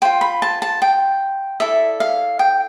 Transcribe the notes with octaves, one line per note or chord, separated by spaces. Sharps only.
F4 C5 G5
B5
A5
A5
G5
E4 A4 D5 E5
F5
G5